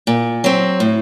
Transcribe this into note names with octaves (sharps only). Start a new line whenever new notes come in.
A#2
F#3 C4
A2